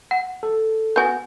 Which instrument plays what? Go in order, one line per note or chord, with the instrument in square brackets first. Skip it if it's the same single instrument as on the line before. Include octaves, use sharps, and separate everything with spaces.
[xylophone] F#5
[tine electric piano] A4
[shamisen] B3 F#4 [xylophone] G#5 G6